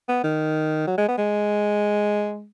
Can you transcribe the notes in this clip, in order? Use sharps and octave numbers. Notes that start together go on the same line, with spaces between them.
B3
D#3
F#3
G#3
B3
G#3